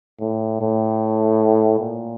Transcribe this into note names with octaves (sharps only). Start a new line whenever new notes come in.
A2
A2
A#2